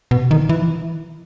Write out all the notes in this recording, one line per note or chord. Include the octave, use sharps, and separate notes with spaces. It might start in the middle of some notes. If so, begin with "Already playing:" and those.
B2
D#3
E3